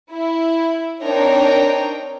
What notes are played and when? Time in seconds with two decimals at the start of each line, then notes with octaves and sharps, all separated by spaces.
0.11 E4
1.02 C4 D4 D#4 A#4 C#5 G5